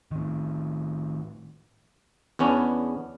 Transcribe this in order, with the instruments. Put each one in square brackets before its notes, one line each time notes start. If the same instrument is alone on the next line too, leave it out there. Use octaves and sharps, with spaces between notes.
[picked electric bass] A2 D#3
[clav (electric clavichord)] E2 B3 C#4 D4